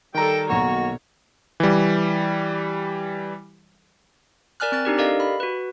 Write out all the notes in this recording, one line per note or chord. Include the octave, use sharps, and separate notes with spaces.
D#3 G3 A4 G5 A#5
B1 A#3 F#4 C#5
E3 G3
A#4 D5 G#5 F6 F#6
C4 F#6 A6
D4 D#4 G4 A#4
G4 A4 A#4 D5 D#5 F5
B5
F#4 B4